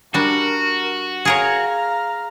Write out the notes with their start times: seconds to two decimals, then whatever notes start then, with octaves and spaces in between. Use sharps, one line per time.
0.14 G3 D4 F#4 A#4
1.25 G#4 A#4 C#5 F5 A#5